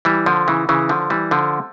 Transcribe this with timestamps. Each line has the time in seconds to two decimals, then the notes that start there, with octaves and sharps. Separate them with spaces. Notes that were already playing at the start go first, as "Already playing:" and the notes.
0.05 E3 G3
0.26 D3 F3
0.48 C#3 E3
0.69 C#3 E3
0.89 D3 F3
1.10 E3 G3
1.31 D3 F3